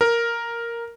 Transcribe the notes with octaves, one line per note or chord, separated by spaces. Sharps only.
A#4